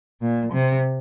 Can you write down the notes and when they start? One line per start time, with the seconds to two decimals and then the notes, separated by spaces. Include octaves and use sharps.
0.21 A#2
0.53 C3